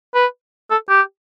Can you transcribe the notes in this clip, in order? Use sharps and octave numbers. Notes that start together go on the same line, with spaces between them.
B4
A4
G4